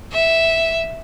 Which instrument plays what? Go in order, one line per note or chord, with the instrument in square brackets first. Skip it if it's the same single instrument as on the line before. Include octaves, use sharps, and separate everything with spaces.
[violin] E5